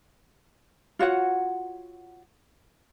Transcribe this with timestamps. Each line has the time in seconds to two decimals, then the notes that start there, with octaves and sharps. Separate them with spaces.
0.99 F4 F#4 C#5 F#5